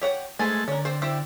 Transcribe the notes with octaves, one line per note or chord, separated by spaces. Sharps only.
G4 C#5 F#5
G#3 A3 A4 B4 C5 G#5
D3 C#4 A#4
C4 C5
C4 E4 G4